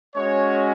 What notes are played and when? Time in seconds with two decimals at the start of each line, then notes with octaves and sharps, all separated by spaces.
0.14 G#3 C#4 F#4 C#5